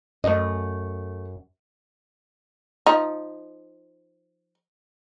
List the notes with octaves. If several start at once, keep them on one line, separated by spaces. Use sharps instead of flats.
F#2 A3 D#5
F3 D#4